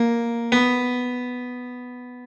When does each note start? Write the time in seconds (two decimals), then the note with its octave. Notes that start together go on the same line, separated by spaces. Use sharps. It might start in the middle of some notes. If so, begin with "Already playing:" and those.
Already playing: A#3
0.52 B3